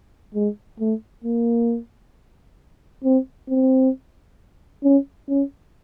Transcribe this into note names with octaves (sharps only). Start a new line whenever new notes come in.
G#3
A3
A#3
C4
C4
C#4
C#4